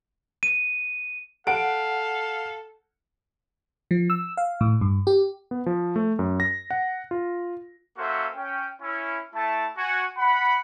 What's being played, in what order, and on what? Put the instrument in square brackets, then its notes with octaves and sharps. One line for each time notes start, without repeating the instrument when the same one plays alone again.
[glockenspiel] D#7
[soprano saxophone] A4 [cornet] F5 [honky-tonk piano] F#5 D7
[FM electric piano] F3
E6
F5
A2
G2
G4
[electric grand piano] B3
F3
A3
F#2
A#6
F#5
F4
[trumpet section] A#3 C#4 F#4 A4 C5 E5
C#4 G5
C#4 E4
A3 E4 A5
F#4 G#5
F#5 B5